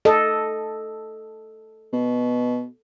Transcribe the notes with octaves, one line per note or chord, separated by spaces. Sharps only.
A4 D#5
B2